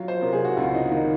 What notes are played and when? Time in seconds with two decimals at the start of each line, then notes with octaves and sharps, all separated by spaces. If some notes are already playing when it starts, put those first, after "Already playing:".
Already playing: F#3 F4
0.08 C5
0.21 C3 A#4
0.33 G#4
0.45 F#4
0.57 C#2 F4
0.74 D#4
0.92 D#3 D#4